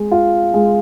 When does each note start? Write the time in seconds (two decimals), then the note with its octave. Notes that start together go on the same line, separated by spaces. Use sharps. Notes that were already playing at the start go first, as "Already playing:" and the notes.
Already playing: G#3
0.11 F4
0.54 G#3